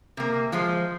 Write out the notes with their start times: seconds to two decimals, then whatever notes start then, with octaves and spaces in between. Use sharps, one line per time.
0.17 C3 A#3
0.52 F3 G#3 C5